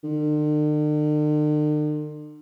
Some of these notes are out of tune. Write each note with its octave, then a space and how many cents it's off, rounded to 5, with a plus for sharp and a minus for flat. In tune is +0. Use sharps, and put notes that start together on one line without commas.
D3 +45